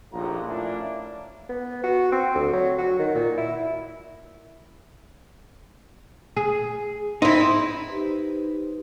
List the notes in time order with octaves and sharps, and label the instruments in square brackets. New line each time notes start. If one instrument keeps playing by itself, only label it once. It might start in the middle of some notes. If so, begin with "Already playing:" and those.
[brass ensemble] A#1 D#2 A2 F3 F4 A#5
A3 A#3 C#4 D4 E4 F4
[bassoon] B3
F#4
C4
D2
F#3
F#4
D#3
A#2
E4
[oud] G#4
[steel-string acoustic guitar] C4 E4 [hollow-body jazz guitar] D#4
[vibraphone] D#4 G4 B4 C5